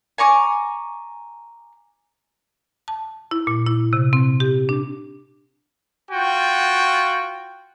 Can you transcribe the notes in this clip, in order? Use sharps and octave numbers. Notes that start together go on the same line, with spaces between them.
G#5 A#5 C#6 D6
A5
E4
A#2
E4
C3
C4
G4
D4
F4 F#4 G5